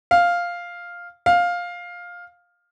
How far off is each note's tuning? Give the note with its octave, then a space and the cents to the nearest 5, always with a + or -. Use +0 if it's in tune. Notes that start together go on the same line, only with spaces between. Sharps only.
F5 +0
F5 +10